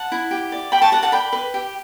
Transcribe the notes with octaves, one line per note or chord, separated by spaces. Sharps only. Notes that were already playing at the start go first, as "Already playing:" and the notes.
Already playing: F#5 A5
E4
G4
D5
G4 G5 B5
A5 C#6
G4 F#5 A5
F#5 A5
D5 G5 B5
B4
G4